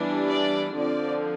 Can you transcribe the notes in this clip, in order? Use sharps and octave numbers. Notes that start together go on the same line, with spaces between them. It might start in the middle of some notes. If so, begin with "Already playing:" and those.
Already playing: E3 G3 B3 D4
D5
D3 F3 C4 D5